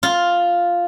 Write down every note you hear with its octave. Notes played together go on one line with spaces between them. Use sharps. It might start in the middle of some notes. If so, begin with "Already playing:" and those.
F4